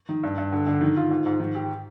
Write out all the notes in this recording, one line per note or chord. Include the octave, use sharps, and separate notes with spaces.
D#3
G2
G2
D3
D3
D#3
F4
G#2
G#2
D#3
G4